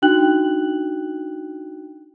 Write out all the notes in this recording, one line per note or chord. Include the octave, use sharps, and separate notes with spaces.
D4 D#4 F#4 G5 F#6 F#7